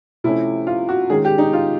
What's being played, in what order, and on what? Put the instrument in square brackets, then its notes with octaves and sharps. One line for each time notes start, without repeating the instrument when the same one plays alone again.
[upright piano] C3 F3 A3 C#4 E4
F4
F#4
D#3 G#3 C#4 G#4
G4
D#4
F4